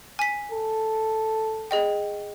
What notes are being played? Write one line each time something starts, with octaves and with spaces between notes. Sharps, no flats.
G#5 B6
A4
G#4 D#5 G5